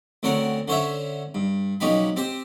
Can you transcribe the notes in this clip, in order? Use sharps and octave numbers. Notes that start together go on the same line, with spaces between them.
D2 C4 C#4 A#4 F#5
D3 C#4 C5 C#5 E5
G2
B1 F3 C#4 D#4 G4 B5
C4 G4 C5